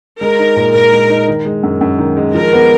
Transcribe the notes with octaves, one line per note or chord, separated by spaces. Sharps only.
G#3 A#4
D#4
A#2
A#2 A#4
G#3
D#4
D#3
G#3
F#2
F#2
D#3
G#3
F3 A#4
B3